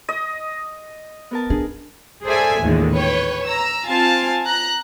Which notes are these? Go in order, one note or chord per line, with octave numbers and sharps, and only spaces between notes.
D#5
B3 A#4 A5
D4 G#4
G#4 A4 C5 D5 E5 G#5
A1 D#2 A#2 D3 D#3 G#3
B4 C#5 G5
A#5 E6
C4 F4 F5 G#5 A5
A#5 F#6